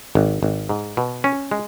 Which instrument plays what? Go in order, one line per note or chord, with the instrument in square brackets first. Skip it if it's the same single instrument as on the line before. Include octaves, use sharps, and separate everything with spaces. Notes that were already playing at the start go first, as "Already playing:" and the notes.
[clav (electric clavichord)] G#1
G#1
G#2
B2
C#4
G#3